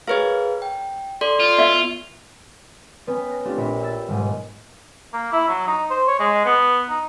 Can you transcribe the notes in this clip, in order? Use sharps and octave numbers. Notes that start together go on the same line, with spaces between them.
G#4 A#4 B4 C#5 F5
G5
A4 D5 C6
F4
B3 D5 E5 F5
B3 C#4 B4 G5 G#5
F#6 A#6
A3 C4 D4 F4 G4
A#1 A#3 C#5 B5
G5 E6 A6
D#1 G#2 B2 D#7
A#3
E4
F#3
D#4
C5
C#5
G#3
B3
D#4